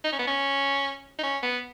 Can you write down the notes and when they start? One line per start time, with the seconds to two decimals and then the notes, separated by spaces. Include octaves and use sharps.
0.04 D#4
0.13 C#4
0.19 B3
0.27 C#4
1.19 D#4
1.23 C#4
1.43 B3